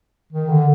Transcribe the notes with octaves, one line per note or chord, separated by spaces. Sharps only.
D#3
D3